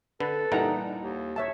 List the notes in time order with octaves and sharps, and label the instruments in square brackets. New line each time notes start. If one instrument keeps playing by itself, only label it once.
[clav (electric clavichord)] D3 [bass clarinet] A4 [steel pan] B4
[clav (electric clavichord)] A#2 E3 G3 [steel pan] D#4 F#5 A#5
[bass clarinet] D#2
[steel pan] C#5 E5 A5